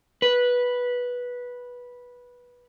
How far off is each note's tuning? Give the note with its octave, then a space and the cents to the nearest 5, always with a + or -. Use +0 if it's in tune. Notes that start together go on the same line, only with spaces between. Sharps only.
B4 -10